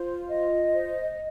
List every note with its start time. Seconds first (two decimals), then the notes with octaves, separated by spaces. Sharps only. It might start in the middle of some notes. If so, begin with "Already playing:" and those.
Already playing: F4 C5
0.27 D#5
0.73 C5